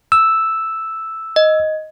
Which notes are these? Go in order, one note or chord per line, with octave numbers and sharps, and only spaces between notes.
E6
D#5